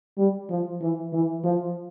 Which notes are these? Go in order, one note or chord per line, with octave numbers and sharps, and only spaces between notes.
G3
F3
E3
E3
F3